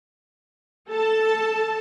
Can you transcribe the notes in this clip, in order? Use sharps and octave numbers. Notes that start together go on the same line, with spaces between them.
A4 A5